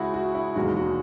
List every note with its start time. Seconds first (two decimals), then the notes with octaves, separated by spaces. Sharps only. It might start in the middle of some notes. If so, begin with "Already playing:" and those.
Already playing: C#2 C#3 G#3 E4 F#4 G#4
0.14 F#4
0.35 E4
0.56 E1 D#2 D#3 G#3 F#4
0.77 F#4